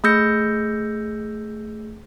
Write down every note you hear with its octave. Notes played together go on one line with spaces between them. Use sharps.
A3 G#4 E6 G6 A#6 C#7